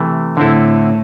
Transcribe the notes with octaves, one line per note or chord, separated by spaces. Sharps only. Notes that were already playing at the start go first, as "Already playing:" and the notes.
Already playing: C3 E3 A3
A2 D3 C4 E4 A4